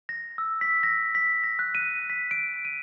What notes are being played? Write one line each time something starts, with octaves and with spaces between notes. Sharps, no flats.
A#6
E6
B6
A#6
B6
A#6
F#6
D#7
B6
D7
D#7